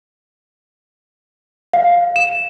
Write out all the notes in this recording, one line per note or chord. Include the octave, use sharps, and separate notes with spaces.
F5
E7